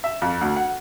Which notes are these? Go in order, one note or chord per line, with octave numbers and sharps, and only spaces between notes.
E5
F2
D2
F#5